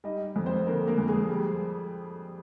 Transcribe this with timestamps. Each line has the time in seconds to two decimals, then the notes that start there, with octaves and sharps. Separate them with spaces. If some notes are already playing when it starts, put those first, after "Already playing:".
0.04 G3 D#4 D#5
0.36 F2
0.46 C4 C5
0.66 D3 A#3 A#4
0.87 A#3 A#4
0.98 F2
1.07 G#3 G#4
1.29 G3